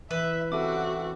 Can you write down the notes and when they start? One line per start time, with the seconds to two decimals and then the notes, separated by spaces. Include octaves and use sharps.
0.11 E3 B4 E5
0.52 C4 C#4 F#4 G4 A4 E5 D6